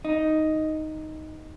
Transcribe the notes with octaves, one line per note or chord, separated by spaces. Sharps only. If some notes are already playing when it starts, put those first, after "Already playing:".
D#4